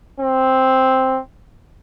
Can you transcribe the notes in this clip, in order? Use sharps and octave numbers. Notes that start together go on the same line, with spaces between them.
C4